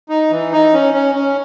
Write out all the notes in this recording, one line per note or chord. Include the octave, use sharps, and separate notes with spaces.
D#4
E3
D#4
C#4
C#4
C#4